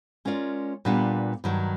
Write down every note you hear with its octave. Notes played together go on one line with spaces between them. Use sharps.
G#3 C#4 F4 A#4 D5
A#2 G3 B3 D4 F4
G2 D#3 F#3